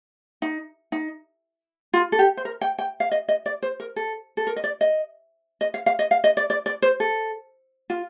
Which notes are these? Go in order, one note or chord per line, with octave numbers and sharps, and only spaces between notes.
D#4
D#4
F4
A4
G4
C5
A#4
G5
G5
F5
D#5
D#5
D5
C5
A#4
A4
A4
A#4
D#5
D5
D#5
D#5
F5
F5
D#5
F5
D#5
D5
D5
D5
C5
A4
F4